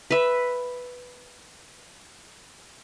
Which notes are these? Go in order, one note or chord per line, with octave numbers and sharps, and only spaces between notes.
B4 E5